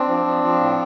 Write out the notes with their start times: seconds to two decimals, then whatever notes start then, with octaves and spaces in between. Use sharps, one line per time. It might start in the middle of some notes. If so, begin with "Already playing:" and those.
Already playing: C4 D4
0.08 F3
0.26 F3
0.44 F3
0.61 A2